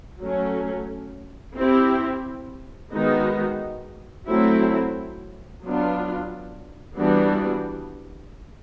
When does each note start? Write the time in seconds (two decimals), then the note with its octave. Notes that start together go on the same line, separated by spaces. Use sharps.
0.22 F#3 A3 C#4
1.57 C4 E4 G4
2.93 D#3 G#3 B3 D#4 F#4
4.28 F#3 A3 C4 E4
5.63 F#3 B3 D4 F4
6.98 E3 G3 B3 D4 F#4